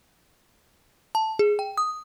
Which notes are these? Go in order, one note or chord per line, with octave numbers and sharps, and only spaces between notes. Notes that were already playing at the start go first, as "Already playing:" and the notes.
A5
G#4
G5
D#6